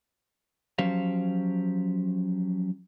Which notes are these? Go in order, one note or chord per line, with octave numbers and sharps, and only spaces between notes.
F3 F#3 C#4 G4 C5 F5